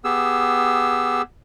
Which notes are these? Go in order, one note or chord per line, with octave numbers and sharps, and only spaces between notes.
B3 G4 G#4 E6